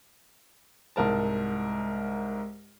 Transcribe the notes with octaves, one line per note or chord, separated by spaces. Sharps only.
C2 G#2 A#4 A5